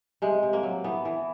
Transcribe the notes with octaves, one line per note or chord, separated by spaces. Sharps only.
C3 G#3
C3
A#3
F#3
E3 B3
E3